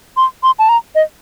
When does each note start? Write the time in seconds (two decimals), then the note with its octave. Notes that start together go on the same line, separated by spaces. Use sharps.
0.17 C6
0.43 C6
0.59 A5
0.69 A#5
0.95 D#5